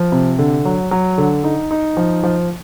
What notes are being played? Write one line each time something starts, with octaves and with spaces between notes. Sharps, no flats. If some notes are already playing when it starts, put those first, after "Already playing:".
Already playing: F3
C3
D3
F#3
F#3
D3
D#4
D#4
F3
F3